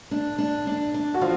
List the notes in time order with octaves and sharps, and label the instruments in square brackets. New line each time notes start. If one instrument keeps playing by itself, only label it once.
[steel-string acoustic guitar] D4
D4
D4
D4
[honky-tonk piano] F#4
[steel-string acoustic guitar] F3 [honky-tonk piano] F4